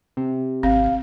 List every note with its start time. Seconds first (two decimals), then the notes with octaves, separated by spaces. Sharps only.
0.17 C3
0.63 G#1 C4 F5